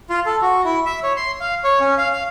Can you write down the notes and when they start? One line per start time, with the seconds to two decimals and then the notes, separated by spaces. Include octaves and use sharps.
0.10 F4
0.26 A4
0.42 F#4
0.65 E4
0.86 E5
1.03 C#5
1.17 C6
1.40 F5
1.64 C#5
1.80 C#4
1.98 F5
2.13 F5